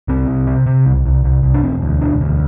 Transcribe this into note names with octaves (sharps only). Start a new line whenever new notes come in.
C2 C4
C2
C3
C3
C2
C2
C2
C2
D4
E1 C4
D2
E1 D4
D2